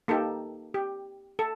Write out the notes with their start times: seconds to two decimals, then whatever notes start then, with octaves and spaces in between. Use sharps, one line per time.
0.08 A#3 D#4 G4 A4
0.74 G4
1.39 A4